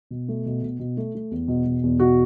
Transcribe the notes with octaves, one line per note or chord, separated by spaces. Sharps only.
B2
A3
B2
B2
B2
A3
A3
E2
B2
B2
E2
B2 F#4